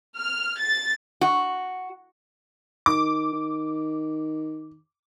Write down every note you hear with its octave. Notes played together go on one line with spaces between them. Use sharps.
F6
A6
F#4
D#3 D6
D#3